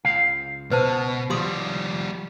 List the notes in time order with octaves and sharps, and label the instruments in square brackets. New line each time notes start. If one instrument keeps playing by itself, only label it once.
[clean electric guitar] C#2 F5
[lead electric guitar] B2 [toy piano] B4 C5 A5
[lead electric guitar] F3 G3 [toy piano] G4 C6 D#6